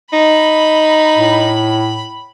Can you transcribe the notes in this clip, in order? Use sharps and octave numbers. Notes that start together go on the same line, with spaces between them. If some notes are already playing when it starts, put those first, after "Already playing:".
D#4 B5
A2